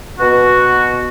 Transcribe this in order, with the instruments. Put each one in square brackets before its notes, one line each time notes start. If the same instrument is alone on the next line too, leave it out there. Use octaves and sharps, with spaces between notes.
[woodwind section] B2 F#4